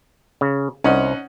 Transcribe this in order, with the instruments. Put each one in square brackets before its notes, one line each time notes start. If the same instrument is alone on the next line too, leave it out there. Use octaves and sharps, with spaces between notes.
[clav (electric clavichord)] C#3
[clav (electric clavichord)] C2 [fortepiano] C#4 D#4 F#5